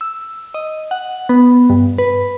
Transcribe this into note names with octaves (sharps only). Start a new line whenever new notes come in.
E6
D#5
F#5
B3
G2
B4